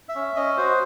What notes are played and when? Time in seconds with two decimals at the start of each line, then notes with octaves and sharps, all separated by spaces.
0.09 E5
0.15 C#4
0.36 C#4 D#5
0.57 F#4 C5